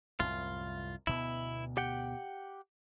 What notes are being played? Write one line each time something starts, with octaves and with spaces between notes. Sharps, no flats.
C2 F#2 A2 F4
D2 B2 B3 E4
G4 F#5 G5